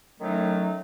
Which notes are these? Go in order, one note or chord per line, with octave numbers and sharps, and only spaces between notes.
A2 D#3 F#3 A3 C#4 D#4